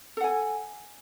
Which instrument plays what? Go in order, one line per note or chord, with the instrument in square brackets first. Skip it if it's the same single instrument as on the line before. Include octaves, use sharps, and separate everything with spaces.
[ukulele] A4
F#5
G#5